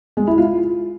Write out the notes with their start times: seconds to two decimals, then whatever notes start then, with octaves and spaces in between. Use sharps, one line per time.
0.17 G#3
0.27 E4
0.38 F4